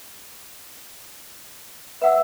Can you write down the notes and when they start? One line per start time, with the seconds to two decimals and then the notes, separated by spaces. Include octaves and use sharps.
2.02 B4 E5 F#5 E6